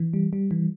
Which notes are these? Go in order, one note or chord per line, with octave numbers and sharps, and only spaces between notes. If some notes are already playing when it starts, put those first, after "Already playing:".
Already playing: E3
G3
G3
E3